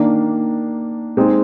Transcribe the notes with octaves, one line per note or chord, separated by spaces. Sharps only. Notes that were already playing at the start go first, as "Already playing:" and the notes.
Already playing: D#3 A#3 D4
G#3 C4 D#4 G#4